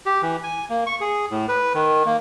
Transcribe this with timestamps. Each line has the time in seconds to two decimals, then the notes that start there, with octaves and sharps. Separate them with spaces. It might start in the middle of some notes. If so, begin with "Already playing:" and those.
0.06 G4
0.22 E3
0.43 G#5
0.70 A#3
0.87 C#6
1.01 G#4
1.31 A2
1.48 B4
1.75 D#3
2.06 A#3